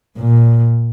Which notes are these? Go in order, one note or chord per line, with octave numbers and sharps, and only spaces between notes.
A#2